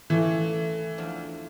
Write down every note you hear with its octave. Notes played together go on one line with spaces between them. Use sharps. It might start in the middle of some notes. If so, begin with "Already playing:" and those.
C#3 E3 A3
E2 F3 D4